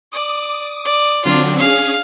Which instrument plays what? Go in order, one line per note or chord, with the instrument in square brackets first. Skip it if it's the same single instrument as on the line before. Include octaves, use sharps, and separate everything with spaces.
[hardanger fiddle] D5 [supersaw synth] D6 D#6
[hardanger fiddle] D5
[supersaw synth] D3 F#3 C4 [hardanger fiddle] D4 F4
[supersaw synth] C#4 G#4 [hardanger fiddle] F5